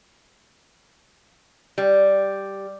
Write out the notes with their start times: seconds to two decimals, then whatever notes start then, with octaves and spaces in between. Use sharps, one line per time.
1.78 G3